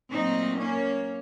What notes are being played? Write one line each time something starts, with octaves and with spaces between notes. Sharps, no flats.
A#2 F#3 A3 C4 D#4
A#3 C#4